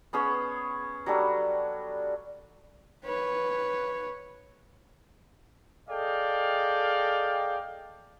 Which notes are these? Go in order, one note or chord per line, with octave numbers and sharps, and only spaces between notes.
B3 C#4 G#4 C#5
F#3 G3 D4 A4
B4 C#5
G#4 A4 D5 D#5 F5 G5